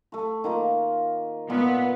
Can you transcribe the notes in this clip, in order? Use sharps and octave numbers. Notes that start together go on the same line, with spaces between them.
A3 C#6
D#3 A#3 F4
A#2 B3